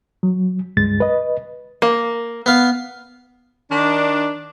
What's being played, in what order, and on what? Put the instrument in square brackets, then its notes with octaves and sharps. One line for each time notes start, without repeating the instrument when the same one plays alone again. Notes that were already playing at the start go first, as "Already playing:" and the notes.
[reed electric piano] F#3
C#2 G2 G#3 A6
B4 D#5
[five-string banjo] A#3
[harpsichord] B3 F5
[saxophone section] D#3 D4